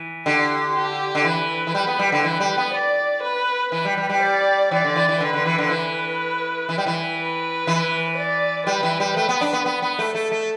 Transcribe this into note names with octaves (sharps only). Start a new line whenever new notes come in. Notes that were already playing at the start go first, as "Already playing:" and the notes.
Already playing: E3
D3 G4
G4
D3
E3 B4
E3
G3
B3
G3
D3
E3 B4
G3
B3
D5
B4
E3 B4
G3
G3
G3
D5
E3 D5
D3
E3
E3
D3 B4
D3
E3
D3
E3 B4
E3
G3
E3
B4
E3
D5
G3 B4
E3
G3
A3 B4
B3
D4
B3
B3 B4
B3
A3
A3 A4
A3